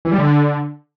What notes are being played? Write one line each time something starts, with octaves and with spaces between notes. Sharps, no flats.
E3
G3
D3